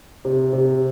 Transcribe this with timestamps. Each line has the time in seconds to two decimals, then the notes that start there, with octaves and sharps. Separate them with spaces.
0.25 C3
0.53 C3